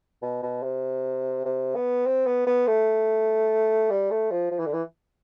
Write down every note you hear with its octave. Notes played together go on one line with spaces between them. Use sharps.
B2
B2
C3
C3
B3
C4
B3
B3
A3
G3
A3
F3
F3
E3
D3
E3